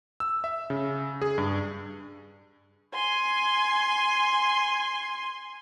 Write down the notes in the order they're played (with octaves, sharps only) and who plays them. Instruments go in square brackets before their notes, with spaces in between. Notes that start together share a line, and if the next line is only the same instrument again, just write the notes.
[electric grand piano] E6
E5
C#3
G#4
G2
[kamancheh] G#5 C6